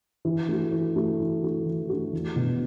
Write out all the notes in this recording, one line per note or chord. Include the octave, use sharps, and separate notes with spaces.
E3
A3 F#4
E3
A3 F#4
E3
A3 F#4
E3
A3 F#4
E2
B2 B3